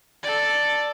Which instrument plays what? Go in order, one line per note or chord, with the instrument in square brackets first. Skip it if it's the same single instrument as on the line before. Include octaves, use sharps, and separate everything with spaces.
[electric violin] A4 D5